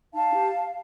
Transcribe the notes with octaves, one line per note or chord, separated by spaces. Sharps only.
D#4 F5 A5
G4